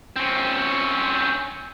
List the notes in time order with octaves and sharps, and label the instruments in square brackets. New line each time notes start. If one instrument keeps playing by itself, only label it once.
[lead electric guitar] C4 C#4